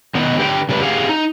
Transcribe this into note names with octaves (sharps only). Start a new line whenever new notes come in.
D#3 B3 D#4
D3 G4 B4 F#5 G5
C#3 G3 A3 B3 B4
G4 G#4 F5 F#5
D#4